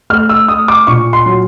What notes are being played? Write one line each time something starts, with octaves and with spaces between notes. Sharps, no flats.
A3 F6
E6
A3 D#6
D6
A#2 C#6
C6
F#3